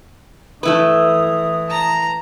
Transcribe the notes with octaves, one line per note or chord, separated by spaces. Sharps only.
E3 A3 E4 B4 D#6
A5 A#5